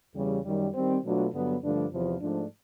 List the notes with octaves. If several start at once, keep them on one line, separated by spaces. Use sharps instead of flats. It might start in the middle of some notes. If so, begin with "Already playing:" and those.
E2 C#3 E3 G3
F#2 D#3 G3
D#3 G3 C4
B2 F#3 A3 D4 F4
G2 D3 F#3 B3
G2 D3 F3 A3 D4
E2 C3 F3
G#2 F3 A3 D4